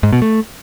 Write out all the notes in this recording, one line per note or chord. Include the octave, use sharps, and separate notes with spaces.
G#2
B2
A3